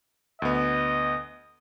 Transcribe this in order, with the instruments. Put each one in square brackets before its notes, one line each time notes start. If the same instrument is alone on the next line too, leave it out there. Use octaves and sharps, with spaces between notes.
[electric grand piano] D2 B3 [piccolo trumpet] D#5